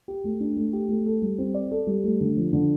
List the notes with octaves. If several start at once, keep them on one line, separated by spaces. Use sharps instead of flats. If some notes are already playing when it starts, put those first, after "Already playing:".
G4
A3
D4
A3
G4
A3
A4
G3
C4
D5
A4
G3
A3
D3
F3
D3